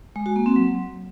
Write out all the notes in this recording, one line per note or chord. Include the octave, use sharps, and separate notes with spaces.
G#3
F#4
A#3
C4
F#3